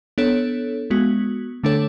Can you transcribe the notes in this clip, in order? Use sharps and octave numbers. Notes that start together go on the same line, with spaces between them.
B3 D4 A4 C#5
G#3 B3 F#4
D3 A3 D4 A4 C#5